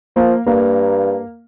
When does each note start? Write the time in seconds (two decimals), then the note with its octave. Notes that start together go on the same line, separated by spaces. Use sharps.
0.16 F3 A#3
0.46 G2 A#3